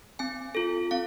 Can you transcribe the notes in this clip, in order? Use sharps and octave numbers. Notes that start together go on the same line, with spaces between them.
C4 G#5
F4 A4
C4 F5